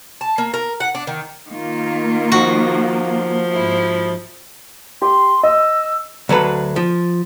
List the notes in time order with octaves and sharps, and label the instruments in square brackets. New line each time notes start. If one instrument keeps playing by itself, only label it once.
[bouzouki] A5
A#3
A#4
F#5
D4
D#3
[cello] D#3 F4 [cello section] A#3
[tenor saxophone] F3 [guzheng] F#4
[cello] G#2 E4
[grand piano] G4 [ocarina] C6
[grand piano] D#5 [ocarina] E6
[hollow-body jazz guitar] D2 F#3 A4 B4
F3